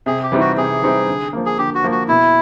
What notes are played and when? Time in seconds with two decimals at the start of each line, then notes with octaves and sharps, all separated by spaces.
0.06 C3 G#4
0.23 G4
0.32 E3 G3 C4 D#4
0.40 F#4
0.57 C3 G#4
0.82 E3 G3 C4 D#4
1.07 D3
1.33 F3 A#3
1.46 G#4
1.58 D3 G4
1.75 F#4
1.84 F3 A#3
1.92 F#4
2.08 B2 E4